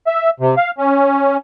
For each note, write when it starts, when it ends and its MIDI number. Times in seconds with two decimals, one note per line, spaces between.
0.07 0.30 76
0.40 0.55 48
0.57 0.71 77
0.78 1.37 61